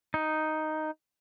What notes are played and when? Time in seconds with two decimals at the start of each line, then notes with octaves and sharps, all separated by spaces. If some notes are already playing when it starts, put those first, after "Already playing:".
0.14 D#4